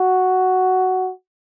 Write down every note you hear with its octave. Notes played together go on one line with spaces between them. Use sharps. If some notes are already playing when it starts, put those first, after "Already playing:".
Already playing: F#4